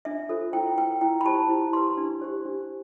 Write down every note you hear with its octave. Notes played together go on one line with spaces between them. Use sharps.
D4 E5
F4 A4 C5
E4 G5
B4 G5
E4 G5
B5
G4 C5 A5
E4
G4 B4 C6
D4
G4 C5
D4